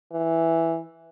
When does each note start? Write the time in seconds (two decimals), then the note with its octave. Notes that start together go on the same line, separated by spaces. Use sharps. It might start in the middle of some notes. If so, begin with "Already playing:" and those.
0.13 E3